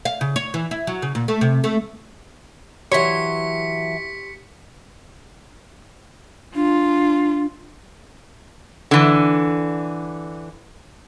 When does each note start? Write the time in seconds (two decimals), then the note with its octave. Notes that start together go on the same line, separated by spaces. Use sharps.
0.05 F5
0.21 C#3
0.36 C#5
0.54 E3
0.71 E4
0.87 F#3
1.02 C#3
1.15 A#2
1.28 A3
1.41 C3
1.64 A3
2.92 E3 F#3 G4 C#5 C6 C#6 B6 C#7
6.55 D4 F4
8.91 D3 E3